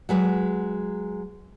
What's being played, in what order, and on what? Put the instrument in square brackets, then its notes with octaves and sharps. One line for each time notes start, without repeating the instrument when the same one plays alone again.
[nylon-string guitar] F#3 G#3 B4